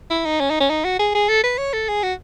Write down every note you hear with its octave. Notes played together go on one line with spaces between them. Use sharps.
E4
D#4
C#4
D#4
C#4
D#4
F#4
G#4
G#4
A4
B4
C#5
A4
G#4
F#4